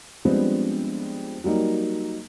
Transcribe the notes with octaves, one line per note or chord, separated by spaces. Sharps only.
F3 G3 G#3 B3 C4 D4
F#3 G3 A#3 D#4